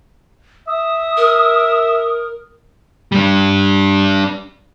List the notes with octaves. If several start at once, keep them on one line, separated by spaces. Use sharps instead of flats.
E5 D#6
A#4
G3 D4